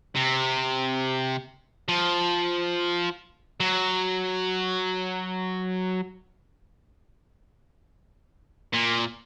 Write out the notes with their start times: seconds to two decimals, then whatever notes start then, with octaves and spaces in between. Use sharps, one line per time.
0.16 C3
1.88 F3
3.60 F#3
8.74 A#2